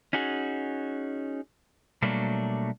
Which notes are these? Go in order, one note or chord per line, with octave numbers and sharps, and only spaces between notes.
C#4 D#4 F#4 G#4
B2 F#3 G3 A3 A#3 D4